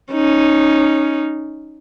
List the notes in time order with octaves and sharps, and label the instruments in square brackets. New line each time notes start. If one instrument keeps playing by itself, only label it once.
[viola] C#4 D#4